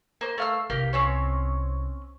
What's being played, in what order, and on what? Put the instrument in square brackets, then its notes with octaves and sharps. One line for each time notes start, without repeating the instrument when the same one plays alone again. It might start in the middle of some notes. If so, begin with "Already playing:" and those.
[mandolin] A#3 C5
A3 F5 E6
[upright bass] C2 [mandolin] A#3 G4 F5
[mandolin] C4 C#4 C#5